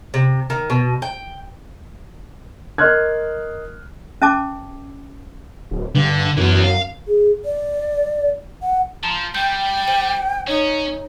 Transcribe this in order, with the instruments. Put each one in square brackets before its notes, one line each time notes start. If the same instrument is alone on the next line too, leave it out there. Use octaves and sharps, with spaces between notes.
[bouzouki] C3
D#3
B2
G5
[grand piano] A#4 D#5 C6 F6 F#6 G#6
[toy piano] C#4 E5 A5 D6
[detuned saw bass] D1
[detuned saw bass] G2 [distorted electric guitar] D3
[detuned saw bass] F#2 [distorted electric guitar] E3 B3
[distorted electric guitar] F5
[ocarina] G#4
D5
F#5
[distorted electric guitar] F3 [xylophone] A5 A#5 C6
[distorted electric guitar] G3 [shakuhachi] G5 [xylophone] G6
[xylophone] C5 D#7 F#7
[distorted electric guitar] C#4 [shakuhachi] D#4 [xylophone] C#5